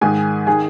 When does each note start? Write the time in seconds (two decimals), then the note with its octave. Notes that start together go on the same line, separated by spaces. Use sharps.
0.01 G#2 D#3 G#4 G#5
0.47 D#3 G#4 G#5